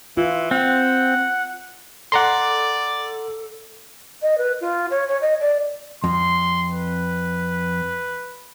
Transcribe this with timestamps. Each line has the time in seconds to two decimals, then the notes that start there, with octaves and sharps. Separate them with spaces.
0.17 E3 F4
0.51 C4 F#5
2.12 A4 D5 F#5 A#5 C6
4.22 D#5
4.37 B4
4.61 F4
4.90 C#5
5.08 C#5
5.21 D#5
5.40 D5
6.04 F2 C6
6.70 B4